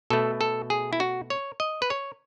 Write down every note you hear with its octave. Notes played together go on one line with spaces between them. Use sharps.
B2 A3 A4
A4
G#4
E4
F#4
C#5
D#5
B4
C#5